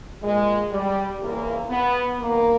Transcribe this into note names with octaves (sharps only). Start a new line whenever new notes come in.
A#2 G#3
G3
E2 C#3 E3 A#3
B3
G2 D#3 A#3